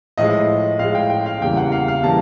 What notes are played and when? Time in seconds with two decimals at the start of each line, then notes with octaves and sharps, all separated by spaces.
0.18 A2 F3 G#3 D#5
0.79 A2 F3 G#3 F5
0.95 G5
1.10 G5
1.26 F5
1.41 E2 C#3 E3 G3 A#3 G5
1.57 F#5
1.72 F5
1.88 F5
2.03 C#3 E3 G3 A#3 A5